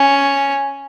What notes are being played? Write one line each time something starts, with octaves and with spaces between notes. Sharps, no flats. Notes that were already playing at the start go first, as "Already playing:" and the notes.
Already playing: C#4